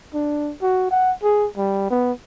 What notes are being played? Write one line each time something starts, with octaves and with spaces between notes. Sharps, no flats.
D4
F#4
F#5
G#4
G3
B3